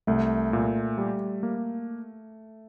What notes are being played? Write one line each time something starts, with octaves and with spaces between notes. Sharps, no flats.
C2 A3
A#2
G3
A#3